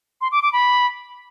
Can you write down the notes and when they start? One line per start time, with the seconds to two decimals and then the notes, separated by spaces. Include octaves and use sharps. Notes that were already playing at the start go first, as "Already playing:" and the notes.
0.21 C6
0.32 D6
0.42 D6
0.53 B5